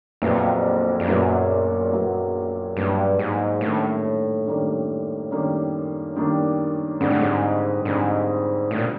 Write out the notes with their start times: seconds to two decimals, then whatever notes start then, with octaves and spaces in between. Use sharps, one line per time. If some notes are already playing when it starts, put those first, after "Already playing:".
0.22 A#1 F2 A#2 F#3 B3 E4
1.00 F2
1.07 A#1 F#2 A#2 F#3 B3 E4
1.92 A#1 A#2 F#3 B3 E4
2.77 A#1 G2 A#2 F#3 B3 E4
3.19 G#2
3.61 F#2 A2 D#3 G3 A#3 D4
4.47 F#2 D#3 G3 A#3 D4
5.31 F#2 D#3 G3 A#3 D4
6.15 F#2 D#3 G3 A#3 D4
7.00 F2 G#2 D3 G3
7.10 A2
7.21 G#2
7.85 F2 G#2 D3 G3
8.70 A2 D3 G3
8.78 A#2